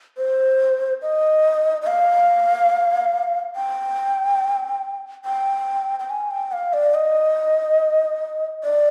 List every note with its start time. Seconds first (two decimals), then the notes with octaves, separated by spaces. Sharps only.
0.17 C5
1.02 D#5
1.82 D#5
1.87 F5
3.56 G5
5.25 G5
6.00 G5
6.10 G#5
6.31 G5
6.52 F5
6.73 D5
6.94 D#5
8.64 D5